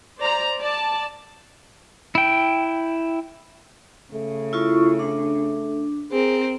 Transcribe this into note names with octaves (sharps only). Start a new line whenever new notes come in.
C5 D5 A#5
D5 A5
E4 G5
C#3 A3
E4 F4 C#6
D4
C4 G#4 A#4